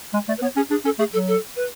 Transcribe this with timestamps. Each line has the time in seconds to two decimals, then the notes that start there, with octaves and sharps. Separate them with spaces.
0.13 G#3 G#5
0.28 A3 D5
0.38 B4
0.42 B3 C#5
0.56 C#4 G#4
0.70 D4 G#4
0.85 C#4 A4
0.99 A3 G#4
1.13 F#3 A4
1.28 A4
1.56 B4